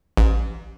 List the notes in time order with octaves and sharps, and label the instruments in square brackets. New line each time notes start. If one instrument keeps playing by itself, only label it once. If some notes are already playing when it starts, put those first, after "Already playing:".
[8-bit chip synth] A1